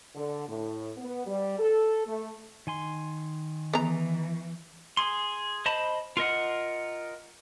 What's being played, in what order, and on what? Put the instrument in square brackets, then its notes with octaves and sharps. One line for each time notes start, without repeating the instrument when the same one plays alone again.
[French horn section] D3
A2
B3
G3
A4
A3
[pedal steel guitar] D#3 G#5 C6
[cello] E3 [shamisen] B3 A#5
[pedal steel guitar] G#4 C6
C5 D#5 A5 B5
F4 A#4 D#5 F#5